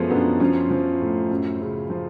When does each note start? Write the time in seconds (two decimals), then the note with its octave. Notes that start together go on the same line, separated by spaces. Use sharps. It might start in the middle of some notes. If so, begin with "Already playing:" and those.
Already playing: F#2 F3 G#3 A3 B3 C#4
0.10 F#2 B3 D4
0.40 F3 C#4 F4
0.70 F3
1.01 A2
1.31 F#2
1.61 C#3
1.90 F3